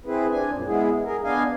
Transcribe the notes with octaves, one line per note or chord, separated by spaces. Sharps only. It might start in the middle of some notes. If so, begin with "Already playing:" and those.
C4 E4 G#4 B4
C4 D4 G#5
F#2 A#2 C#3
G#3 B3 E4 G#4
G#4 A#4
B3 D4 D#5 F5 G#5